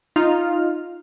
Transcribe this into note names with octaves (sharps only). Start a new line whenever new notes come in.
D#4 F4 F6